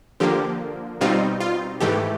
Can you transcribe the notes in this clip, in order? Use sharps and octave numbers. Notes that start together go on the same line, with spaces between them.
D3 F3 A#3 G4
B2 G3 C4 D#4 F4
F4
G#2 E3 A3 G4